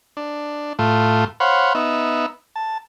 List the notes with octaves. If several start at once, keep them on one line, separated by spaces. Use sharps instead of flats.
D4
A2 A3 F4
C5 C#5 F5 F#5 B5
B3 D#4 E5
A5